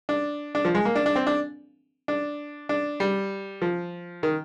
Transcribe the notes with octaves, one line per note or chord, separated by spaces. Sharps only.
D4
D4
F3
G#3
A#3
D4
D4
C4
D4
D4
D4
G3
F3
D#3